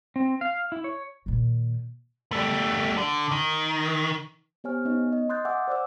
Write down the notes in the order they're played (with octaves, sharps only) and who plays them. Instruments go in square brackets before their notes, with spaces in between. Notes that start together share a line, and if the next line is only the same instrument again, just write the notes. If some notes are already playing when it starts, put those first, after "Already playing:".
[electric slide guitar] C4
F5
E4
C#5
[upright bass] A#2 D#3
[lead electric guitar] G3 A3
D3
D#3
[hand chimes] B3 G4 C5 C#5 G#5 F6
B3 C#4 D#4 C#5 D#5
D#5
C6 D#6 F#6 G6 A6
E5 F#5 G#5 D6 E6
C5 D5 D6 E6